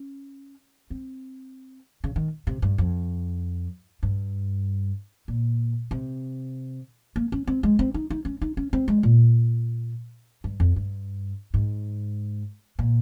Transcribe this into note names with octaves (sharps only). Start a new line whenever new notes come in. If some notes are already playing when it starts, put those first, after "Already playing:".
Already playing: C#4
C4
C#3
D#3
C3
G2
F2
G2
A#2
C3
A#3
C#4
C4
G#3
C4
D#4
D#4
C#4
D#4
C#4
C4
G#3
A#2
G2
F2
G2
G#2
A#2